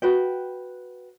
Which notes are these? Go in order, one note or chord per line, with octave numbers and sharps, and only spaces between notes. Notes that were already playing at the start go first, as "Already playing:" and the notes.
F#4 B4 G5